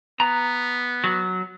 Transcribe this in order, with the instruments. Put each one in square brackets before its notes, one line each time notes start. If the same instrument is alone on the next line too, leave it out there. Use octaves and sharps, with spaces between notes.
[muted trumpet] B3 [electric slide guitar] A#5
[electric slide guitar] F#3